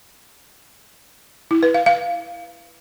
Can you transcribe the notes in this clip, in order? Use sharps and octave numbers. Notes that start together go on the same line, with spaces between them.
E4
B4
F5
F5